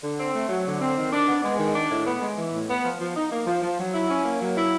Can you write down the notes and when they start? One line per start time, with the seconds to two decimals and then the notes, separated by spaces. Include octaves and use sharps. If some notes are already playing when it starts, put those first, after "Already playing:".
0.02 D3
0.19 C4
0.34 A3
0.49 F#3
0.66 D3
0.81 C4
0.96 D#3
1.12 D4
1.28 B3
1.43 G#3
1.59 D#3
1.75 D4
1.90 A2
2.06 B3
2.21 G#3
2.37 E3
2.53 A2
2.68 B3
2.84 F3
3.00 F3
3.15 D#4
3.31 A#3
3.46 F3
3.62 F3
3.78 F#3
3.93 E4
4.09 C#4
4.24 A#3
4.40 F#3
4.56 E4